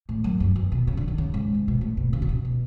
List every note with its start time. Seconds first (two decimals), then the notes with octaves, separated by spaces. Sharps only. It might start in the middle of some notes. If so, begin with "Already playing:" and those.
0.09 A2
0.24 F#2
0.40 F#2
0.56 E2
0.72 B2
0.87 C#3
0.97 D3
1.08 D3
1.18 C#3
1.34 G#2
1.54 C#3
1.68 B2
1.81 A2
1.97 B2
2.13 C#3
2.22 B2
2.29 C#3
2.45 B2